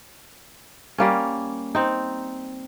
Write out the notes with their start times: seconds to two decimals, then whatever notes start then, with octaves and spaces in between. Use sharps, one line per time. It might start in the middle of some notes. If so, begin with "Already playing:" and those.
0.98 G3 A#3 C#4
1.75 C4 D#4